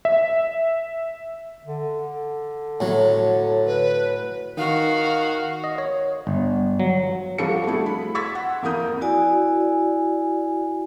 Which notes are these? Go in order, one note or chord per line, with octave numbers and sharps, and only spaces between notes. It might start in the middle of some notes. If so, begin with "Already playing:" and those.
E5
D3
A2 F#3
B4
D#3 F#4 F5
D#5
C#5
G1
F#3
C2 F3 G3 F#4 A4 C#7
A3 D4 E4 F#4 G#4
B5
C6 C#6 E6 G#6 A6 B6
F#5
F2 A#3 E4 A#4 D#6 G6
E4 F#4 D5 G#5